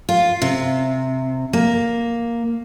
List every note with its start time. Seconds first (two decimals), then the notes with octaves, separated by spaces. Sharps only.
0.09 F4
0.42 C3
1.53 A#3